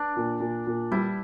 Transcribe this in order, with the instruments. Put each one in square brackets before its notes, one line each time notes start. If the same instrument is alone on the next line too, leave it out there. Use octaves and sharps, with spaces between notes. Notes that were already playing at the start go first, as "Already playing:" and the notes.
Already playing: [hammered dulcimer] D4
[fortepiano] A#2
A#2
A#2
[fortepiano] G3 [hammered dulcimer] E4